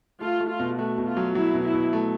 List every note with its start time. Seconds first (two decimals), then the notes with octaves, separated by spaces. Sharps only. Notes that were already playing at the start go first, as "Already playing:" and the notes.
0.21 A3 F4
0.40 A3
0.50 F4
0.60 B2
0.79 A3 F#4
0.98 B2
1.07 F4
1.17 F#3
1.35 F#3 E4
1.54 B2
1.64 E4
1.74 B2
1.93 A3